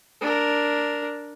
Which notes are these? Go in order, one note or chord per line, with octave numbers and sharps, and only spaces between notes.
D4 A#4